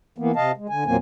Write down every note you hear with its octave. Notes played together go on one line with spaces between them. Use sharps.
E3 A#3 B3
C3 D#5 F5 A5
G#3
D3 G#5
E2 A#2 F#3 A#3 C4 G#5